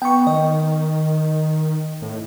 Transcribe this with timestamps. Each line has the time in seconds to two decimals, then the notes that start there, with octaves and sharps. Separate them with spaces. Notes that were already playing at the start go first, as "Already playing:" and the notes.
0.02 B3 G5 C#6
0.27 D#3 D#5
2.02 A2